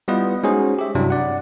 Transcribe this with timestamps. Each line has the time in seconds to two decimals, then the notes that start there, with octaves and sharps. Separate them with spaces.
0.08 G3 B3 E4 F4 B4 D#5
0.43 G#3 C#4 D#4 F#4 G#4 C5
0.79 G4 E5
0.95 G2 C3 F#3 G3 D4 E4
1.10 D5 F#5